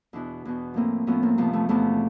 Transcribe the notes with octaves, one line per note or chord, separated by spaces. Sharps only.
E2 B2 D4 E4
E2 B2
A2 F3 A#3 C4
A2 F3 B3 C#4
A#3 C4
E2 C3 F3 A3 B3
A3 B3
E2 C3 F3 A3 B3